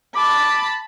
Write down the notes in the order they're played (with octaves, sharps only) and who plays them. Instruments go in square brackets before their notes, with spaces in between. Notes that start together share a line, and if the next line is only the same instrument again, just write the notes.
[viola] A5 B5 [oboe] D6